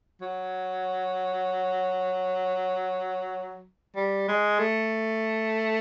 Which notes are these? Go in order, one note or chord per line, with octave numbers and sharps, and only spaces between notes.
F#3
G3
G#3
A3